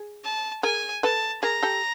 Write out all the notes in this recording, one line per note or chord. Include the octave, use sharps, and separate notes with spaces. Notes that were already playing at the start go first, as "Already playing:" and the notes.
Already playing: G#4
A5
G#4 A#4 G#5
A4 B4 A5
G#4 A#4 A#5
G4 A4